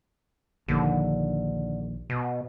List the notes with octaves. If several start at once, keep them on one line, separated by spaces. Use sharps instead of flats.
A#1 D#2 D3
B2